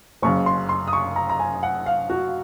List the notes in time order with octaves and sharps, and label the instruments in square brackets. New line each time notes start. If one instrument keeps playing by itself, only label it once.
[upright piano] F#1 F#2 C#3 C#6
C6
C6
D#6
C#6
A#5
A#5
G#5
F#5
F5
F#4